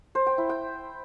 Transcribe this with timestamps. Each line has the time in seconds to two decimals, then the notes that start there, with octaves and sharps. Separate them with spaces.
0.15 C5
0.26 G5
0.38 E4
0.49 G5